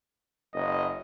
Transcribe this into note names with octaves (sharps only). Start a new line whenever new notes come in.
F#1 D#5